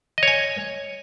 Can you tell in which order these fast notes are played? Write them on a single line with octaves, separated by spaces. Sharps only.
D#5 C#5 G#5